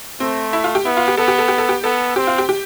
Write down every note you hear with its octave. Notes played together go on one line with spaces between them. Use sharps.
A3 C4
E4
F4
G4
B3 E4
F4
G4
B3 A4
G4
A4
G4
A4
G4
B3 A4
C4 G4
F4
G4
G4